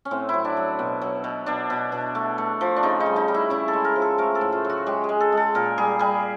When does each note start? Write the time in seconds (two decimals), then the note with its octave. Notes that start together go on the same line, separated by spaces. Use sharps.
0.05 C#4
0.11 A2 C4
0.29 F#3 E4
0.45 D4
0.57 F#3
0.79 B2
1.02 F#3
1.24 B2
1.46 B2 D4
1.70 B2
1.92 B2
2.15 A3
2.38 A3
2.61 F3
2.76 D4
2.83 C#3 D#4
3.00 D#4
3.06 G3
3.16 D#4
3.28 G3
3.34 E4
3.50 C#3 E4
3.68 A4
3.73 G#3
3.85 A#4
3.96 F3
4.02 A4
4.18 A3 A#4
4.35 A4
4.41 A2
4.52 F4
4.64 F#3
4.70 F#4
4.87 G#3 G4
5.04 G#4
5.09 G#3
5.20 A4
5.32 G#3
5.37 A4
5.55 A#2 A#4
5.78 G3 G#4
5.99 G3 G#4